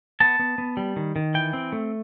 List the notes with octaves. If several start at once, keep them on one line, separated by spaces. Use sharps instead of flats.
B3 A5
B3
B3
G3
D#3
D#3
E3 G5
C4
A3